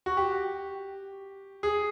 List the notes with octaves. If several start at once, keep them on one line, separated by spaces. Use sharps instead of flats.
F#4
G4
G#4